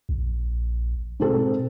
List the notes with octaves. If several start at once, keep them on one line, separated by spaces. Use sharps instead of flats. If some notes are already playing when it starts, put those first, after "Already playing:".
A#1
G#2 B2 C4 A4